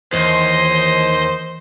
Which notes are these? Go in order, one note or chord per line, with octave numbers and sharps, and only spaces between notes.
D#2 E3 C5 D#5 C6